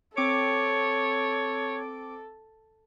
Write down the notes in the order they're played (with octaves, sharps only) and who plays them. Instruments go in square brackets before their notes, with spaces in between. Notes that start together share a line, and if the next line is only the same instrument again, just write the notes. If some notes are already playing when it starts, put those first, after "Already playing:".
[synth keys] C4 D6 D7 [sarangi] A4 [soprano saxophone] C#5